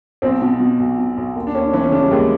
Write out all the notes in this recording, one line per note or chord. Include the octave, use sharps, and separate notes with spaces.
B1 C4
B2
B2
B1
B2
B1
D#2
D4
D#2 C#4
D4
E3 C#4
C#4
C#3 D4
G3
D#2 G#3